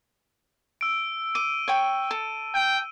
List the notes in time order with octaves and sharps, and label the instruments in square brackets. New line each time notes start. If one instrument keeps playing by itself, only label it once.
[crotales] E6 D7
[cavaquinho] D6 [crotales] D#7
[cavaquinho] C#5 G5
A4
[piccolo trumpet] G5